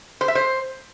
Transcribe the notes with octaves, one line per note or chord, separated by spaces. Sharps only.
C5
E5
C5